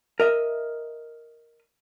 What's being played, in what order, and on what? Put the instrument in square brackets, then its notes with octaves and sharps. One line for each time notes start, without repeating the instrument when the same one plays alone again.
[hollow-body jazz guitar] A#4 D#5 E5